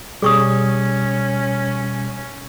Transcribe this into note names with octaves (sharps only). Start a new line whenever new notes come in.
B2 G3 C#4 G#4 C#6 D#6